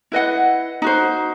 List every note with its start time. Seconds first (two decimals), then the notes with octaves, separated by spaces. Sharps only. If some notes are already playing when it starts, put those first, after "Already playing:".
0.12 E4 B4 D#5 F#5
0.82 D#4 F#4 C5